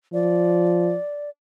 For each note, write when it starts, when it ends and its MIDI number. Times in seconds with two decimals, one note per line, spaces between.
0.13 0.95 53
0.13 1.30 74